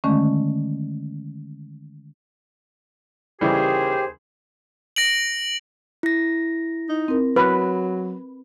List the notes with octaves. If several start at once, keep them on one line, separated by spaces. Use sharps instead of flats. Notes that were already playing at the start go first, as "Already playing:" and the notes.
D3 D#3 G#3 A3 C#4
D#2 C#3 E3 G3 G4 G#4 C5
A#6 D7 F#7
E4 A#6
D#4
C4 A#4
F#3 B4